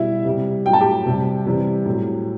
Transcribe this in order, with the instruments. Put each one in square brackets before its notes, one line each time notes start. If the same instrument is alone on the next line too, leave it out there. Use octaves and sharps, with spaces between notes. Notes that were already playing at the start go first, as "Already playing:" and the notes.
Already playing: [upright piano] B2 G3 E4 E5
C3 G3
F#3 G5
A2 A5
G4 G5
C3 G3
C3 E3 G3
A2 F#3